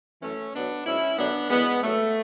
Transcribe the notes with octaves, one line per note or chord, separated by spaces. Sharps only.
F#2 E3 A3 C#4
B2 F#3 B3 D4
G#2 F#3 C#4 E4
F#2 D3 F#3 B3 D4
F#2 E3 G#3 B3
G#2 F#3 A3